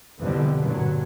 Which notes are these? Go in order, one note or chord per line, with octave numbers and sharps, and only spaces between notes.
F2 B2 D3 E3 G3
G2 A#2 D3 F#3